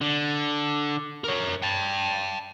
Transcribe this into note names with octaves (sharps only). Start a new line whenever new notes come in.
D3
A#4 C#5
G5 A5